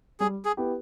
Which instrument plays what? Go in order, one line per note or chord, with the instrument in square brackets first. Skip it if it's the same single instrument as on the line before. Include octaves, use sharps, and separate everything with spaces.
[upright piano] G3 [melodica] G#4
[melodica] G#4
[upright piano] B3 E4 G4